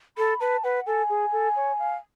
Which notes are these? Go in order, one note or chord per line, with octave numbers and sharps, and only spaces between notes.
A4 B5
B4 A5
B4 F#5
A4 G#5
G#4
A4
C#5
F5